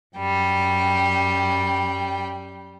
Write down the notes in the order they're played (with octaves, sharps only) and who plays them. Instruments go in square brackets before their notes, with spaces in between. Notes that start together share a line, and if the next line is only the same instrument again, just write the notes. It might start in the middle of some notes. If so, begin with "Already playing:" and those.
[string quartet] F#2 G3 G5